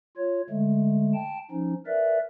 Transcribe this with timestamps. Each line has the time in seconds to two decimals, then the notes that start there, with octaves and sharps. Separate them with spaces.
0.17 F4 C#5
0.50 D3 G#3 A3
1.14 G5 A5
1.51 F3 C#4 D#4
1.86 A#4 B4 D5 E5